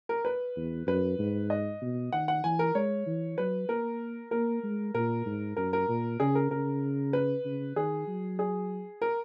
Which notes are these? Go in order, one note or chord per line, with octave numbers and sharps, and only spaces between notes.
A#4
B4
E2
F#2 B4
G#2
D#5
B2
D#3 F#5
F#5
E3 G#5
A#4
G#3 C#5
E3
F#3 B4
A#3 A#4
A#3 A#4
G#3
A#2 A#4
G#2
F#2 A#4
A#4
A#2
C#3 G#4
A#4
C#3 A#4
B4
C#3
D#3 G#4
F#3
G#4
A#4